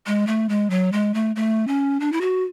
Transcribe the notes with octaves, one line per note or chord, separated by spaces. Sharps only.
G#3
A3
G#3
F#3
G#3
A3
A3
C#4
D4
E4
F#4